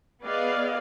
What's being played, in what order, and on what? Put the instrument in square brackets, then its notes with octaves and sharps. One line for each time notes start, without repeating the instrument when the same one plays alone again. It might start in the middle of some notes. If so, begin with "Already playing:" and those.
[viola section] B3 G#4 D5 D#5 F5